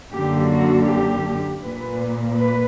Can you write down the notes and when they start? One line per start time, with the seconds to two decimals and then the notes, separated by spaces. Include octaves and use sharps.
0.14 F#2 D3 A#3 G4
0.51 F#4
0.89 G4
1.62 A#2 A#3 B4
2.37 B4